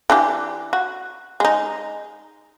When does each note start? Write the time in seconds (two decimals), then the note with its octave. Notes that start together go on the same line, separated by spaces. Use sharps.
0.10 E3 D4 G4
0.73 F#4
1.40 G#3 D#4